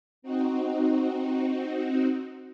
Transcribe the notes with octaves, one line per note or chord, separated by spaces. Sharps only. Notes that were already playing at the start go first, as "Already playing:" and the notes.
C4 D#4 F#4